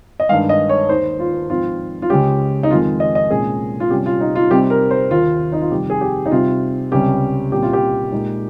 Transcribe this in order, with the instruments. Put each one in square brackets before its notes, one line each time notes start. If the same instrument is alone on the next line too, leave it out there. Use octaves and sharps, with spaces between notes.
[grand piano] D#5
G2 D#3 G#3 F5
D#5
C#5
D#2 D#3 A#3 D#4 C5
F4
G#2 F3 C4 F4
F4
C#2 C#3 G#3 C#4 G4
D#4
F2 D#3 G#3 F4
D#5
D#5
C2 A#2 G#3 C#4 G#4
F4
C3 G3 C#4 G4
F4
D#4
F4
C3 G3 C4 D#4 G4
A#4
C5
D#2 D#3 A#3 F4
D#4
F4
F2 C3 D#3 G3 G4
G#4
G4
D#4
C3 G3 C4 F4
C#2 C3 G3 C#4 G4
C2 A#2 G3 C#4 G4
F4
G4
A#2 G#3 D#4